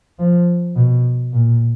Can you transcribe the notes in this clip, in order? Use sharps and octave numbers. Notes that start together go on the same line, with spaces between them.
F3
B2
A#2